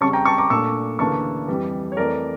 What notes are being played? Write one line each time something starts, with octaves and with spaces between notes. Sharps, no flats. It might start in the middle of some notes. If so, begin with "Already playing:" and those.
F2 C#3 G3 C#4 A5 C#6
G5 A#5
A5 C#6
A#5 D6
A#2 A3 D4 C#6 E6
D2 C#3 E3 A#3 D4 A5 C#6
F2 E3 G3
C#5
F2 E3 A3 A#4 D5